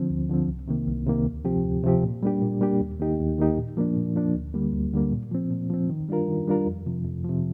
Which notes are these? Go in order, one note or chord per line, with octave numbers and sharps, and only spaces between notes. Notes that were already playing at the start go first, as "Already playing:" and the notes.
Already playing: D3 F3 C4
D2
D3 F3 C4
C2
C3 D#3 A#3
C2
C3 D#3 A#3
D2
C3 F3 C4 G4
D2
C3 F3 C4 G4
A#2
G3 A#3 D4 G4
A#2
G3 A#3 D4 G4
D#2
D#3 A#3 D#4 G4
D#2
D#3 A#3 D#4 G4
A#2
F3 A#3 D4
A#2
F3 A#3 D4
D2
D3 G3 A#3
D2
D3 G3 A#3
A#2
F3 C4
A#2
F3 C4
D#3
G3 D4 F4 A#4
D#3
G3 D4 F4 A#4
F2
C3 F3
F2
C3 F3